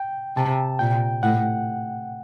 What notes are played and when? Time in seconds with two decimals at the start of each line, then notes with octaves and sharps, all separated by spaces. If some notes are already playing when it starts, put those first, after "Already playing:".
Already playing: G5
0.37 C3 A5
0.79 A#2 G5
1.23 A2 F#5